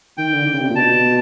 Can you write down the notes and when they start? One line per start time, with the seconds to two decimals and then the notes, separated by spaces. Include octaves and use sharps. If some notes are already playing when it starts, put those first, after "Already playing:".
0.18 D#3 G5
0.33 D3
0.46 D3
0.53 C#3
0.61 C3
0.70 A#2
0.76 B2 A5